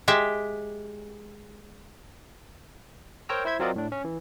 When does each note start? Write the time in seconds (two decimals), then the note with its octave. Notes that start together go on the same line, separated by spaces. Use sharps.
0.08 G#3 G4 E5
3.29 A#4 C5 C#5 G5 A#5 E6
3.45 E4 C5 E5 G#6
3.60 F#3 C4 F4 A#4 D5 D#5
3.76 A2 D4
3.92 C#4
4.04 E3